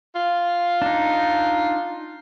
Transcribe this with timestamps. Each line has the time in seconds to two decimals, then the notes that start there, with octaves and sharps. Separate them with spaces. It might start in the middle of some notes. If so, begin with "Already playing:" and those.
0.16 F4
0.82 D4 D#4